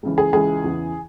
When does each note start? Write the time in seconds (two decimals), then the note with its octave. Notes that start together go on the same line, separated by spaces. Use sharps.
0.03 C#2 C#3 E3
0.18 G#4
0.33 C#2 C#3 E3 G#4
0.64 E2 C#3 E3